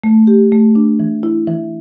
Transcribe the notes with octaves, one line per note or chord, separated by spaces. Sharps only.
A3
G4
A3
D4
E3
E4
E3